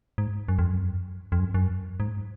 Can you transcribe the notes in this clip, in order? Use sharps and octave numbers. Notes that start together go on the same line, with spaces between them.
G#2
F#2
F2
F#2
F2
F#2
F#2
G#2